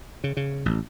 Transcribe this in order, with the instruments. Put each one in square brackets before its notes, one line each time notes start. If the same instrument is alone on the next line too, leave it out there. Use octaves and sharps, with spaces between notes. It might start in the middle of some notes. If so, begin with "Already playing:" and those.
[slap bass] C#3
C#3
A1